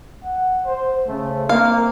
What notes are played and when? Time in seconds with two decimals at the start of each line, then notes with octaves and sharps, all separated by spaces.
0.24 F#5
0.66 C5
1.07 C#3 A3 C5
1.49 A#3 C4 F5